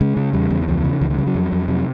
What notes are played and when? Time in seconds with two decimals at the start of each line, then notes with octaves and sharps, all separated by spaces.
0.01 C#3 G#3
0.17 C#3
0.33 E2 G3
0.50 E2
0.62 E3
0.68 C#2 F3
0.85 C#3
1.01 C#2 E3
1.10 D#3
1.18 C#3 G3
1.27 F#3
1.35 F2
1.52 F2
1.68 C3 F#3